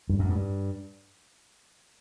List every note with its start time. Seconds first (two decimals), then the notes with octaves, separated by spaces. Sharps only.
0.09 G2
0.19 F#2
0.29 G2